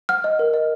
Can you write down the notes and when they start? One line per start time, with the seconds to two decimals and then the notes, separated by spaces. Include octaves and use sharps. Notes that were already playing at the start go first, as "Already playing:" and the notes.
0.09 F#5 F6
0.24 D#5
0.39 A#4
0.54 D#5